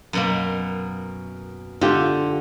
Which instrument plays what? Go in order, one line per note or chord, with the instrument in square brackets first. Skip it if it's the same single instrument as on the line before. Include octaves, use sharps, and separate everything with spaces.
[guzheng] F#2 B2 A#3
[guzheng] D3 [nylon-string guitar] F4 G4